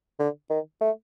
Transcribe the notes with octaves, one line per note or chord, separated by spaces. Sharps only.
D3
D#3
A3